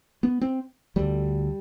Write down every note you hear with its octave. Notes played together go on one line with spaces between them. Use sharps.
B3
C4
D2 D3 G3